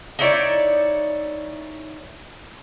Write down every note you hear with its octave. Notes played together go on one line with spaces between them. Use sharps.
D#4 E4 C#5 D5